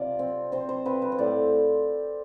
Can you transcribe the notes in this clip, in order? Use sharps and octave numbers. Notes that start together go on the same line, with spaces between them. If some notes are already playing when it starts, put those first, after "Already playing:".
Already playing: C3 F4 D5
C4
C4 C5
C5
C4 B4
B4
C5
A2 D5